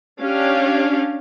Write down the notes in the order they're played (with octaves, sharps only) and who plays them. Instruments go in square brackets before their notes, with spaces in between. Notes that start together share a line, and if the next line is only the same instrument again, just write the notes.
[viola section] C#4 D4 G4 F5